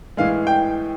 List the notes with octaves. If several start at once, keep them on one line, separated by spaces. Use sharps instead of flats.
A2 E3 G#3 F5
G5